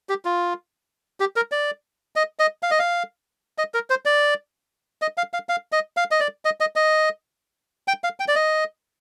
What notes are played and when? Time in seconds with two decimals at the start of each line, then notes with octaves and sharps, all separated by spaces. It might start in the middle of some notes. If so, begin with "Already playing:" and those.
0.09 G4
0.25 F4
1.20 G4
1.36 A#4
1.52 D5
2.16 D#5
2.39 D#5
2.63 F5
2.71 D#5
2.79 F5
3.58 D#5
3.74 A#4
3.90 C5
4.05 D5
5.02 D#5
5.18 F5
5.33 F5
5.49 F5
5.72 D#5
5.97 F5
6.11 D#5
6.20 D5
6.45 D#5
6.60 D#5
6.76 D#5
7.88 G5
8.04 F5
8.20 G5
8.28 D5
8.35 D#5